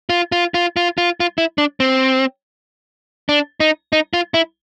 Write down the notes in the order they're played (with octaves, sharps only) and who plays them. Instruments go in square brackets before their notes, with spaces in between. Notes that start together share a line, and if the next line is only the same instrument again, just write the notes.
[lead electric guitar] F4
F4
F4
F4
F4
F4
E4
D4
C4
D4
D#4
D#4
F4
E4